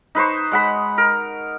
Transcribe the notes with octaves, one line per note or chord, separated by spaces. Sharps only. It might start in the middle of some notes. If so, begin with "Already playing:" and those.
D#4 B4 C5 C#6
G#3 F#5 B5
A#4